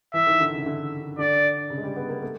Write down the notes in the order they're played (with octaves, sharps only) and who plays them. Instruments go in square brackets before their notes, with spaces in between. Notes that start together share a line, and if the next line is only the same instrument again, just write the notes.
[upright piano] E3 [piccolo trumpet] E5
[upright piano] D#3
D3
C#3
D3
[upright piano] D3 [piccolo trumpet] D5
[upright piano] C#3
G#3
G3
B3
A#3
A3